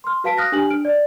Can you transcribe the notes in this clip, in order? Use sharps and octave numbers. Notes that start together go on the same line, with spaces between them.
C6 F6
F#4 B4 F5 A5 B6 D7
D#6 F6 F#6 A#6
D4 G4 G#5 F#7
D4 F6 D7
D5